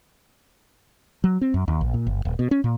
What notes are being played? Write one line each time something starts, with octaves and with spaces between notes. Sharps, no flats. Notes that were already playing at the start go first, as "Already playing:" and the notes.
F#3
C4
F#2
D#2
A#1
A#2
G1
D#1
B2
C#4
A#2